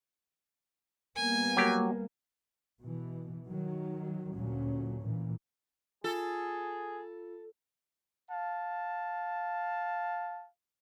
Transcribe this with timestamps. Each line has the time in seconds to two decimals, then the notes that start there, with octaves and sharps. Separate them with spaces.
1.16 G3 A#3 B3 G#5
1.57 F#3 G4
2.81 B2 E3
3.46 D#3 F#3
4.30 D2 A#2 F#3 C#4
5.00 A#2 E3
6.04 F4 G#4 A4
8.30 F5 A5